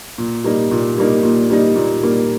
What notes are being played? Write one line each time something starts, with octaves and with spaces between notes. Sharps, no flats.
A#2
G3 A#3 D#4
A#2
G3 A#3 D#4
A#2
G3 A#3 D#4
A#2
G3 A#3 D#4